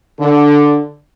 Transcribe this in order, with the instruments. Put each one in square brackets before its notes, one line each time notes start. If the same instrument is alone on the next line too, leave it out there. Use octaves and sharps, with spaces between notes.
[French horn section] D3